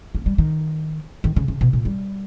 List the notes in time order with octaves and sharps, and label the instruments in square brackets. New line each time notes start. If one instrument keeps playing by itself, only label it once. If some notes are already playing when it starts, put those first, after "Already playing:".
[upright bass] A#3
G3
D#3
D#3
C#3
C#3
B2
A#2
G3